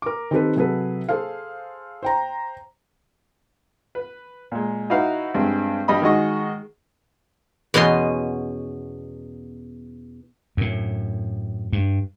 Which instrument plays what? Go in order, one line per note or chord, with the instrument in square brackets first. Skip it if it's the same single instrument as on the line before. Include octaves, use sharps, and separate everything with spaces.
[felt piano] A#4 D6
D#3 C4 G4 A4 B4
C3 F#3 G#4 A4 B4
G#4 A4 C5 F5
C5 G5 A#5
[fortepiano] B4
A#2 G#3
D#4 E4 F#4 B4 F5
G2 G#3 C4
G2 G3 D#5 B5
D#3 G#3 F#4 D#5 C#6
[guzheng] E2 B2 C#4 D#5 C6
[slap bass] F#2 A2
G2